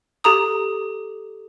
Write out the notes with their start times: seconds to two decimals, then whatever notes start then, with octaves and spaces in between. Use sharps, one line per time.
0.24 G4 A4 A#5 D#6